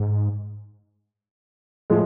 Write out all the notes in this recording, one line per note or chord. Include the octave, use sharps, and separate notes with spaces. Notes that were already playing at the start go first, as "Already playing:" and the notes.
Already playing: G#2
A2 F3 G#3